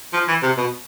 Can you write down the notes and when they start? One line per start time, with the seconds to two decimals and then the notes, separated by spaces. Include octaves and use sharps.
0.13 F3
0.28 E3
0.43 C3
0.57 B2